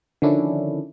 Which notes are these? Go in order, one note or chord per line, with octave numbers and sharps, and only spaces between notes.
D3 D#3 F3 C#4 D4 E4